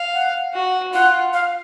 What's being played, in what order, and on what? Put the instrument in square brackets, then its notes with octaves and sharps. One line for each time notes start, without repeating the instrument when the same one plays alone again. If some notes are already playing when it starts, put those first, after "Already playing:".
Already playing: [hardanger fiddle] F5
[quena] F#5
[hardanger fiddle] F#4
[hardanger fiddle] F4 [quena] F#5
[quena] F5